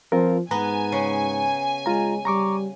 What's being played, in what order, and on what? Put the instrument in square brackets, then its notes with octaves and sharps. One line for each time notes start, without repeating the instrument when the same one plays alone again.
[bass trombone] F3 [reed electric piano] C4 F4 A#4
[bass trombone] G#2 [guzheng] B3 [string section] G#5 [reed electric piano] A#5
[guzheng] C#3
[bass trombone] G#3 [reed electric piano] F4 A#5
[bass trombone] G3 [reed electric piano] A#5 C#6 D6